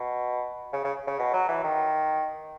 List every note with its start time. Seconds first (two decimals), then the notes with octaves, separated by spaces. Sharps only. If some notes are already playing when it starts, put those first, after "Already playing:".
Already playing: B2
0.73 C#3
0.84 C#3
1.07 C#3
1.19 B2
1.33 F#3
1.48 E3
1.64 D#3